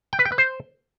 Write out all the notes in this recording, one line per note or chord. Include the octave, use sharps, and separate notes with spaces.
G5
B4
G5
B4
C5